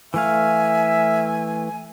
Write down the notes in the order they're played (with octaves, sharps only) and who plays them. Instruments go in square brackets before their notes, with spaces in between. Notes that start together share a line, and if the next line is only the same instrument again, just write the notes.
[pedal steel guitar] E3 A3 F5 [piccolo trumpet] E5 [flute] G#5